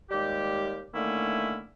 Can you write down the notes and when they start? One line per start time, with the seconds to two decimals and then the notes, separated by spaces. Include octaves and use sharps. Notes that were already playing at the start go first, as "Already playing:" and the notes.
0.11 D#2 G3 G#3 G4
0.94 D3 D#3 A3 A#3 C#4 E4